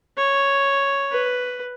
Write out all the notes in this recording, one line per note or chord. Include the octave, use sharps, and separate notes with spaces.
C#5
B4